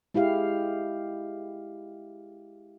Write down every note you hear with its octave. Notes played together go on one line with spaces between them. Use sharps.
G#3 E4 G4 F5